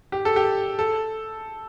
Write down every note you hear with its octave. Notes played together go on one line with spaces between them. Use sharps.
G4
A4
G4
A4